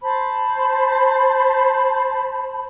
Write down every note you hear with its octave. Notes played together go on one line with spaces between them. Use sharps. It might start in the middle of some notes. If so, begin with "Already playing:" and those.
C5 A5 B5